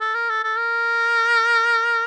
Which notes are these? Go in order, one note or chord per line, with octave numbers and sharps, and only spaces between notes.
A4
A#4
A4
A4
A#4